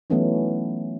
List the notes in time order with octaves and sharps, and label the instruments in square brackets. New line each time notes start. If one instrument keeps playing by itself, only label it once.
[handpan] E3 F#3 A3 B3 C#4 D#4